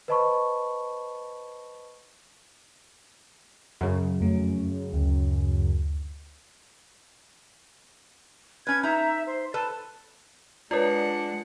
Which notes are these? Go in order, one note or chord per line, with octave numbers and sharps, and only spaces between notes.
B4 C5 D#5 A5 B5 C#6
F#2 C#3
F2 A3
D2
C#4 B4 G#6
D#4 E5 A#5
C5
A4 B4 A5
G#3 D4 F4 A#4 B4 C#5 D5 F#5